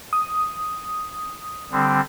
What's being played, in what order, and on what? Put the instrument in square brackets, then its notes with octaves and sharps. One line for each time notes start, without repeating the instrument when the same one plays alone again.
[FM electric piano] D#6
[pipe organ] D3 G3 C4